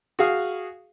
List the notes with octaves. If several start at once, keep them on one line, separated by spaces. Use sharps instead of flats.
F#4 G#4 F5